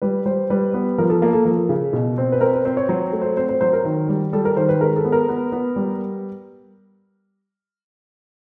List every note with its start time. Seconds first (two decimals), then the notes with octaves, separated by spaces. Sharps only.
0.02 G3 B4
0.25 G3 C5
0.50 G3 B4
0.74 B3
0.98 F3 A#4
1.10 A4
1.22 A#3 A4
1.33 A4
1.45 F3 A#4
1.69 C#3
1.93 B2
2.18 C4
2.32 B4
2.41 C4 A#4
2.54 B4
2.65 C4 C5
2.77 C#5
2.89 F#3 C5
3.13 A3
3.22 C5
3.37 C4 C5
3.49 C5
3.61 F#3 C5
3.73 A#4
3.85 D#3
4.08 G3
4.33 G3 A4
4.45 A#4
4.57 D#3 C5
4.69 B4
4.81 G#3 A#4
4.96 A4
5.05 B3
5.12 A#4
5.28 B3
5.52 B3
5.76 G3